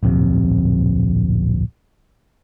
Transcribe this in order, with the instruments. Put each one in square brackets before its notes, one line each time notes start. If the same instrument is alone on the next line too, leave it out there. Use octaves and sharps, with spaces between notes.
[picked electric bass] D1 A#1 F2 C3